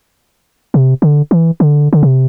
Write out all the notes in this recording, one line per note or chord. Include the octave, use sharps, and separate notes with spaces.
C3
D3
E3
D3
D3
C3